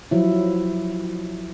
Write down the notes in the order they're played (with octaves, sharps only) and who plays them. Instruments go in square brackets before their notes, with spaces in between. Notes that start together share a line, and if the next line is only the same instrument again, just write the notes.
[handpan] F3 F#3 E4